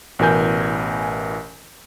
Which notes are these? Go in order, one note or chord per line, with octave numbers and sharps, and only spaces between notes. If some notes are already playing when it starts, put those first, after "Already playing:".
A1 B2 E3 A#4 G#5 G6